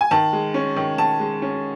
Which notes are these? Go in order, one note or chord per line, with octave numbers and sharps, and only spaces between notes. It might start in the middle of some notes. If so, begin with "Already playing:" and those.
G#5
D#3 A5
G#3
C#4
D#3
D#3 A5
G#3
C#4